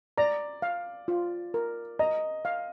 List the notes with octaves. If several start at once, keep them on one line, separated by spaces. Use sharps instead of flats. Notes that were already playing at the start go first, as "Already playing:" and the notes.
D5 A#5
F5
F4
A#4
D#5 A#5
F5